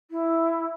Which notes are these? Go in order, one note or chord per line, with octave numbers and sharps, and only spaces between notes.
E4